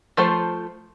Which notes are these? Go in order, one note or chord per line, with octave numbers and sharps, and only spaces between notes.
F3 A3 C5